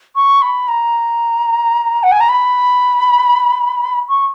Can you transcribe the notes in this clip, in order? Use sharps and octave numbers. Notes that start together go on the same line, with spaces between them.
C#6
B5
A#5
F#5
G#5
A#5
B5
C#6